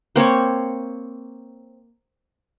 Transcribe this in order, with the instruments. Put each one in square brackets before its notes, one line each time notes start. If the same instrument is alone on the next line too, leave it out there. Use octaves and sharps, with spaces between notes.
[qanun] A#3 C4 C#5 C#6